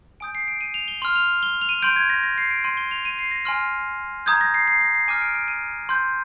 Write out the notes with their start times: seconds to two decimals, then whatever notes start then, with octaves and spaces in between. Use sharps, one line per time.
0.20 G#5 D#6 G6 D7
0.35 C7
0.48 D7
0.61 D#7
0.74 F7
0.88 G7
1.02 C6 F6 G7
1.16 F7
1.43 G7
1.62 F7
1.69 D#7
1.83 C6 G6 D7
1.96 G#6
2.10 A#6
2.23 A#6
2.38 C7
2.51 D7
2.64 C6 G6 D#7
2.77 G7
2.91 F7
3.05 D#7
3.19 C7
3.31 A#6
3.45 G#5 C6 F6
4.26 A#5 D#6 G6 G#6
4.41 A#6
4.54 C7
4.68 C7
4.81 A#6
4.95 C7
5.08 G#5 D6 F6 D#7
5.21 D7
5.35 D7
5.48 D#7
5.89 C6 G6